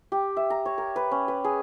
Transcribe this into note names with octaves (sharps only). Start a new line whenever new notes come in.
G4
E5
A#5
C#5
A#4
B4
C#4
B4
G#4